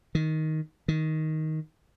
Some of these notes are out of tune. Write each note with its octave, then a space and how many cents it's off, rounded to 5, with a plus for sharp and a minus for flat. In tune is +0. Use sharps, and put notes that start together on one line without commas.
D#3 +10
D#3 +10